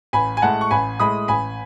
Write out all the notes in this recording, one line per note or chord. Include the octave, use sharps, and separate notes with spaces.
A1 G#5 B5
G#5
A2 G#3 F#5 A5
C#6
A1 G#5 B5
A2 G#3 B5 D#6
A1 G#5 B5